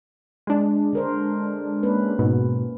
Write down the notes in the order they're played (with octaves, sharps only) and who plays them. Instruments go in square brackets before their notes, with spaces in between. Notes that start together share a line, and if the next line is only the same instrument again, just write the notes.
[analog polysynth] G#3 D4
[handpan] D3 A#4 C5
A#3 C#4 B4
[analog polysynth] G#2 B2